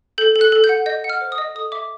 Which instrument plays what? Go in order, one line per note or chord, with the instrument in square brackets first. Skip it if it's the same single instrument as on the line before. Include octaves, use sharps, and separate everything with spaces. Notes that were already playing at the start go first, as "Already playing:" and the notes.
[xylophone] A4 G6
A4
F#6
A4
G6
F#5
D#5 G6
F#5
F6
C5
D#6
D#5
A4 D#6
E5 D6